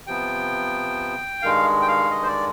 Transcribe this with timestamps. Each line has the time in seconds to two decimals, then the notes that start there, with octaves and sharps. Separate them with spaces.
0.07 C3 F3 B3 G5
1.42 G2 D#3 G#3 F5
1.82 G5
1.88 F5
2.10 D#5
2.23 C5
2.27 D5